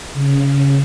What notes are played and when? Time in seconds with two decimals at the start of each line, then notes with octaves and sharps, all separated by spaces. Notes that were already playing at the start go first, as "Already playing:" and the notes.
0.14 C#3